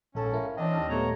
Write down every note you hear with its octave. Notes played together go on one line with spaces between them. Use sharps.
A#1 G#2 C#4 A4 A5
E4 A#4 F5
E3 C4 D4 C#5 D#5 G5
D#2 A5 F6
A#2 G3 A3 B3 C#5 A#5